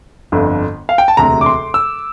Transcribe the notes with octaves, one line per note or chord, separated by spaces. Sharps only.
G1 F2 D3
F5
G5
A5
E1 D2 C3 A#5
D6
C6
E6